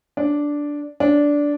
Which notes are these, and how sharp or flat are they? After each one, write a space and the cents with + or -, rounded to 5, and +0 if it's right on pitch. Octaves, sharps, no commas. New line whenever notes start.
D4 -5
D4 -10